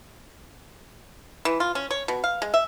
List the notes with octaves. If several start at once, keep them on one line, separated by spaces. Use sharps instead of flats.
E3
F4
C#4
C#5
B2
F5
G#3
E5